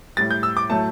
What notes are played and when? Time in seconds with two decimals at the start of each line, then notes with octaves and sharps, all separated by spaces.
0.17 G3 A6
0.20 A2
0.31 G6
0.43 E6
0.57 D6
0.70 A2 F#3 A3 A5